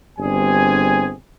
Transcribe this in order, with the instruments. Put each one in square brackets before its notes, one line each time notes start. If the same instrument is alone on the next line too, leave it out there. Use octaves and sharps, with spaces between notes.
[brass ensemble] G1 G2 G3 C4 G#4 G#5